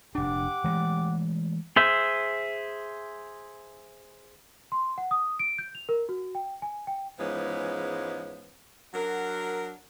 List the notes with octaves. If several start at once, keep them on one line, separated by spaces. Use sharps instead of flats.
F1 D4 G4 F#5 D6
E3 G#3 A3
G#4 C5 E5
C6
F#5
D#6
D7
G6
F7
A#4
F#4
G5
G#5
G5
G#2 E3 F3 G#3 B3 C#4
F#3 D4 F#4 A#4